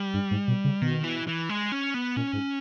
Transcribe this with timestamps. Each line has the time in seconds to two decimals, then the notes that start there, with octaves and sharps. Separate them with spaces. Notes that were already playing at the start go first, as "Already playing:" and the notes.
Already playing: G3
0.14 G2
0.31 G#2
0.48 B2
0.64 C#3
0.81 B2 D#3
1.04 E3
1.27 E3
1.49 G#3
1.72 C#4
1.94 B3
2.17 A#2 C#4
2.33 G#2